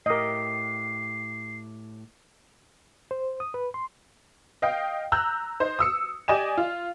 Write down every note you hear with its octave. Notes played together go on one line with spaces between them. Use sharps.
A2 G4 A#4 D#5 C7
C5
D#6
B4
C6
D#5 F5 G5
A#5 E6 F#6 G6
D#4 C5
D#6 E6 C#7
G4 D5 D#5 G#5 E7
F4